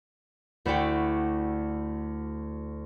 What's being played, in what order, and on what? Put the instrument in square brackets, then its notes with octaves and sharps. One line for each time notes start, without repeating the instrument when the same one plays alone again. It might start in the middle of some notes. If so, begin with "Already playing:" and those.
[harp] D2 E4 F#4 D5 G5